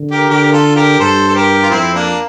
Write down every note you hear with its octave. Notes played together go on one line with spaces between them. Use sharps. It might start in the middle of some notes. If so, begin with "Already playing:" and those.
Already playing: D3
G4 A#4
D3 G4 A#4
A#4
F4 A4
G4 A#4
G2 A4 C5
A4
G4 A#4
F4
F2 C4 E4
A#3 D4